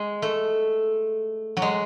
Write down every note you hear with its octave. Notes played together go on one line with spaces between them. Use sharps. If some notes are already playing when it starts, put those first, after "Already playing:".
Already playing: G#3
A3
F#3
G#3